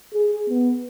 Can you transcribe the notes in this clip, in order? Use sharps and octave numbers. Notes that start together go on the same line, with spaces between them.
G#4
B3